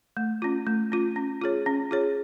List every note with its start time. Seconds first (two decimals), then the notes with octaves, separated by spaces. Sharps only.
0.17 A3
0.42 C#4 F4
0.67 A3
0.92 C#4 F4
1.16 C#4
1.42 F4 G#4 C#5
1.66 C#4
1.91 F4 G#4 C#5